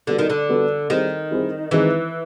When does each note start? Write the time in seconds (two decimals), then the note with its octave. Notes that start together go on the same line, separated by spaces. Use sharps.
0.07 D3 G3 B3 D4 F#4 A4
0.19 D#3
0.30 D3
0.49 G3 B3 D4 F#4 A4
0.90 D#3 G3 C4 E4 G#4 C5
1.31 G3 C4 E4 G#4 C5
1.71 D#3 E3 G#3 C4 D#4 G#4